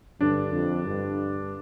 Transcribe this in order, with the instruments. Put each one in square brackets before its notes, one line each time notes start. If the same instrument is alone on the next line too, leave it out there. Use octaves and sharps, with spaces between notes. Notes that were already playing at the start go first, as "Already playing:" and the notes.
[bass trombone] G2 [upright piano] D3 D4
[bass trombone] F2
G2